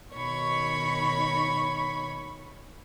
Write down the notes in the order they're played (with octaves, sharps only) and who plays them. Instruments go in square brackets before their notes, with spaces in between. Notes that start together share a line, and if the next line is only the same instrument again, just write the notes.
[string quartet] B2 D#3 C#5 B5 C#6